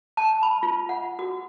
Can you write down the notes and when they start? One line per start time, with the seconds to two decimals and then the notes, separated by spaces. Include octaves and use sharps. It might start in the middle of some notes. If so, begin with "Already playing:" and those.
0.17 A5
0.43 B5
0.63 F4
0.89 F#5
1.19 F#4